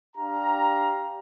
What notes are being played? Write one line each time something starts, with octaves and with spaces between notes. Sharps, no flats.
D4 G4 F5 A#5